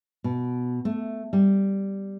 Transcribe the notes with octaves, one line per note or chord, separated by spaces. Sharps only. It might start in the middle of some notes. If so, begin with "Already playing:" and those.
B2
A3
G3